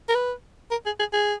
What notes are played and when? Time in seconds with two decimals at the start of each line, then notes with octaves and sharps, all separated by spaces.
0.09 A#4
0.15 B4
0.71 A#4
0.86 G#4
1.00 G#4
1.13 G#4